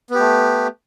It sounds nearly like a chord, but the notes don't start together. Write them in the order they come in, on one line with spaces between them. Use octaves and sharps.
B3 G4 A3